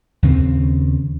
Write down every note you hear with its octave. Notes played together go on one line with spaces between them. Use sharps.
D#2 C#3 G#3 C4